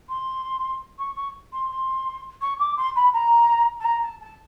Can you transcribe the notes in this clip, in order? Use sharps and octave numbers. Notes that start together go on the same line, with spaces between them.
C6
C#6
C#6
C6
C6
C#6
D6
C6
B5
A#5
A5
A#5
A5
A5